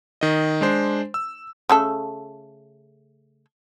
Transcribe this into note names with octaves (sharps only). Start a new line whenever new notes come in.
D#3 D#5
G#3 D4 C5
E6
C#3 A3 A4